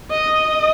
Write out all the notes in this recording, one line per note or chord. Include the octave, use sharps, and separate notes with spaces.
D#5